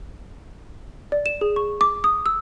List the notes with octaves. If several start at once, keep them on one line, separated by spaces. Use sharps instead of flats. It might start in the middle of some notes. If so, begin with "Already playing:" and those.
D5
E7
G#4
C#6
D6
D#6
E6